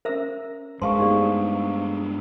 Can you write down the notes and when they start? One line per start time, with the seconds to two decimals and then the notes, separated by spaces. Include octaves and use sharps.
0.05 C#4 A#4 C5 E5 E6
0.82 G2 G#3 C5 F5 A5 C6 C#6
0.99 A3 B3 D#4 G4 G#4 D5